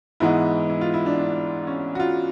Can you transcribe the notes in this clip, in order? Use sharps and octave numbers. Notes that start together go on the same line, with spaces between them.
G#2 E3 G#3 B3 E4
E4
F4
E4
D4
D4
C#4
F#4
F4